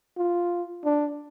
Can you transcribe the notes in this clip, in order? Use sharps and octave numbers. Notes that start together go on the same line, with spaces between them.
F4
D4